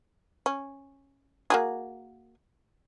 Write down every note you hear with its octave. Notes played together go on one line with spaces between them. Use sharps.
C#4
A#3 F#4 G#4